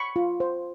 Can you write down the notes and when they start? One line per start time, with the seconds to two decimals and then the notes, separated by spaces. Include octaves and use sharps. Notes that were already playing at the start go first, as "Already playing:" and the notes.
Already playing: B5 C#6
0.16 F4
0.40 C5